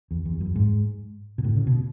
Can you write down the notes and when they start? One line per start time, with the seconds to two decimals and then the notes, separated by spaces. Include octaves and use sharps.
0.11 E2
0.25 E2
0.41 F#2
0.56 G#2
1.38 B2
1.44 A2
1.57 C#3
1.67 B2